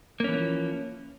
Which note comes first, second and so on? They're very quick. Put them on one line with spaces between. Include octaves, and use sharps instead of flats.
A#3 C#4 E3 F3